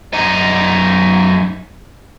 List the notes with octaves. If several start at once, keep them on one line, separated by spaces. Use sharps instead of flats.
F#2 D#4